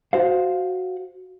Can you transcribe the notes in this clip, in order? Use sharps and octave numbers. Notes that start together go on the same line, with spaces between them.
F#4 C5 F5